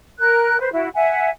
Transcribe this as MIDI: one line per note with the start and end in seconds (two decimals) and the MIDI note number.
0.19 0.60 70
0.19 0.60 90
0.60 0.73 71
0.60 0.73 72
0.73 0.88 64
0.73 0.88 66
0.95 1.29 76
0.95 1.29 78
0.95 1.29 80